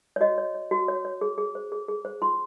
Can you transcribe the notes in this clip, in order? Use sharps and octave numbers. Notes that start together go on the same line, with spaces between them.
C#5
F#4 D#5
C#5
C#5
F#4
C#5
C#5
G#4
G#4
C5
G#4
G#4
C5
F4 C6